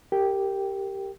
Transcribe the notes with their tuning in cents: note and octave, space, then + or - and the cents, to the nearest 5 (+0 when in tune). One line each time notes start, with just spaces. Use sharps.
G4 +0 A#4 -25 G5 -5